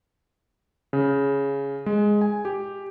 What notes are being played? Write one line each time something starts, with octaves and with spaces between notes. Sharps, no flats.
C#3
G#3
G#5
G4